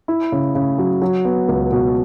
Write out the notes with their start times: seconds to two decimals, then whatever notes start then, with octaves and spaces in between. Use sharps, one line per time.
0.08 E4
0.32 C#3
0.55 C#3
0.78 F#3
1.02 F#3
1.25 B3
1.49 C#2
1.72 B2